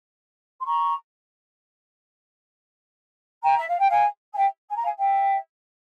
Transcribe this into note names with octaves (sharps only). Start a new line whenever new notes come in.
C6
A#5 C#6
G5 A#5
E5
F5
G5
F5 G#5
G#5
E5 G5
G#5
A#5
F5 G#5
E5 G5